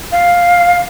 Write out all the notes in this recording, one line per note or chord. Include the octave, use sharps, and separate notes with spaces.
F5